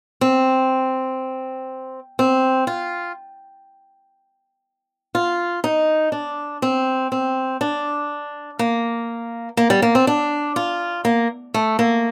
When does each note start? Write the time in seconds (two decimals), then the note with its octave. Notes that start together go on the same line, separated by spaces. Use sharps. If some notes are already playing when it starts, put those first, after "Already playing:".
0.21 C4
2.19 C4
2.67 F4
5.15 F4
5.64 D#4
6.12 D4
6.62 C4
7.12 C4
7.61 D4
8.59 A#3
9.57 A#3
9.70 G3
9.82 A#3
9.95 C4
10.07 D4
10.56 F4
11.05 A#3
11.54 A3
11.79 A#3